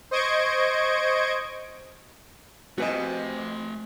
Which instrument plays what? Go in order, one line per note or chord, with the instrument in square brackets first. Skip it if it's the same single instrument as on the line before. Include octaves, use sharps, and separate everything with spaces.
[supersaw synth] C5 D#5 C#6 G#6 D7
[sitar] F2 C3 [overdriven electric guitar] A3 G#5 [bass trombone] C4 [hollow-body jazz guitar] F#4 B4 D#5